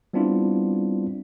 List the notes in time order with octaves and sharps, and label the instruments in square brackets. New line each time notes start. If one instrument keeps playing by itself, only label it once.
[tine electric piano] G3 B3 C4 D4 E4 F4